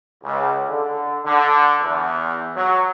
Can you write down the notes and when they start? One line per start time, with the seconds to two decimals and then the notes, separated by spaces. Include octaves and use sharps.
0.24 C#2
0.69 D3
1.25 D3
1.81 E2
2.55 F#3